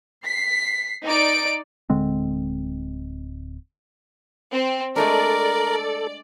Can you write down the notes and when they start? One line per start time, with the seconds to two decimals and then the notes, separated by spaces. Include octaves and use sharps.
0.24 B6 C7
1.05 D#4 D5 D7
1.90 D1 D3 G#3 C4
4.52 C4
4.96 G#3 A3 D4 A4 A#4 D5